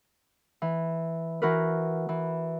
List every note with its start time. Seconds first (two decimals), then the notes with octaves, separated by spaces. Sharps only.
0.62 E3
1.42 E3 F#4 A#4 B4
2.09 E3